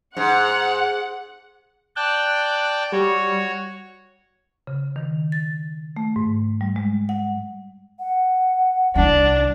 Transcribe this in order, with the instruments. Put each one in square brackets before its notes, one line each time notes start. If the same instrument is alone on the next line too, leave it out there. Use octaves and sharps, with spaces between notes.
[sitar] G#2 [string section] F#5
[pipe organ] D5 G5 A5 [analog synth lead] F#6
[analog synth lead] G3 [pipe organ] F#4 C#5
[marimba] C#3
D#3
A6
A3
G#2
G3
G#3
F#5
[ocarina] F#5
[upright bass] C2 D#3 [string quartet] D4